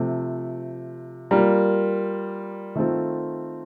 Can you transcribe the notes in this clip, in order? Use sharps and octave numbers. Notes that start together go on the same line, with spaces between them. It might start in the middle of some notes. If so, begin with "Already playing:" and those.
Already playing: C3 F3 A3
G3 A#3 F4 A#4
D#3 A3 C4 F4 A4